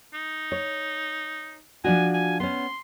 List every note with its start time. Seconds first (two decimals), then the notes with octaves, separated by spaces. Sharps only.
0.14 D#4
0.52 C#5
1.84 F3 D4 F#4 G#5
2.14 G#5
2.40 B3 C#4 C6